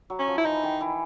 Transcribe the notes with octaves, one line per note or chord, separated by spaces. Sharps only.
F#3
C#4
F3
E4
E3 D#4
D#3
E3